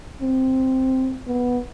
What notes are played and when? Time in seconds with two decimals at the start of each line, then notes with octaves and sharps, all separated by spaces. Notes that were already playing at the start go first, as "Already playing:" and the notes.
0.22 C4
1.27 B3